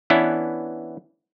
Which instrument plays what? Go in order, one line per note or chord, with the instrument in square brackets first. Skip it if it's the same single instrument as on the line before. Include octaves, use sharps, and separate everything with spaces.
[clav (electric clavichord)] E3 B3 C#4 D4 E4